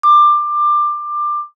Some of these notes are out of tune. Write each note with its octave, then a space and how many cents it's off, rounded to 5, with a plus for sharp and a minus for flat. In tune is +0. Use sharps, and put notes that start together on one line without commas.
D6 +20